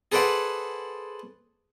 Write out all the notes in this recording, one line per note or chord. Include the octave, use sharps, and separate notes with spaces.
G#4 A4 B4 C5 D5 F#5